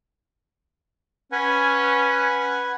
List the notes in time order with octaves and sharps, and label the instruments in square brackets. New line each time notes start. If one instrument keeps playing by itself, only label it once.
[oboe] C#4 [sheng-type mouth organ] B4 F#5 G#5